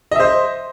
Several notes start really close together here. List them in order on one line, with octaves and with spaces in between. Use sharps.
D#5 E5 C5